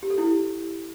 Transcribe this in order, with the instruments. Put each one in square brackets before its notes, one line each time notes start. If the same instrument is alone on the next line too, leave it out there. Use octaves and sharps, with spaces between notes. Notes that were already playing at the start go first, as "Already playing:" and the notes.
[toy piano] G4
A4
E4